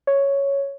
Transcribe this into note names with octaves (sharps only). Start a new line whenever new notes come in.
C#5